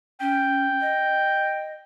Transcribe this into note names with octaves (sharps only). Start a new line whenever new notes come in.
C#4 G5
D#5